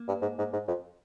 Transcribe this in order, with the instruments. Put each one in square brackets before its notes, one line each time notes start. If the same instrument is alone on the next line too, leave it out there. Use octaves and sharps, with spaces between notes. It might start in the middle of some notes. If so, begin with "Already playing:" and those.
Already playing: [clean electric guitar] A#3
[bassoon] G2
G#2
G#2
G#2
F2